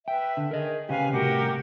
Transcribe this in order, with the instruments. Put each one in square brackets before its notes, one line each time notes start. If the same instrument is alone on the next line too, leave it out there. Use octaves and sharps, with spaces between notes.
[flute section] B4 E5 [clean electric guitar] G5
[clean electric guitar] D3
[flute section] G#4 [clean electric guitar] A#4 D#5
[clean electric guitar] C#3 G4 [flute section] B4 F5 G#5
[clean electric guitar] C2 A2 C3 [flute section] F#4 G4 A#4